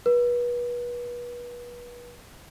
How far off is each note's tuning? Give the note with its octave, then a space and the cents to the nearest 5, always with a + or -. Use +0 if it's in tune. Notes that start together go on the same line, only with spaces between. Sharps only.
B4 -30